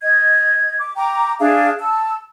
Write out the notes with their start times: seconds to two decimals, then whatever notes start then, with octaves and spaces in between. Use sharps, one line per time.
0.02 D#5 G#6
0.79 D6
0.96 G5 A#5 D6
1.40 D4 G#4 E5 F5
1.79 A5 E6